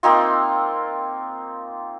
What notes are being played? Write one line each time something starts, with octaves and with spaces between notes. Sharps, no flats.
A#3 C4 D#4 F4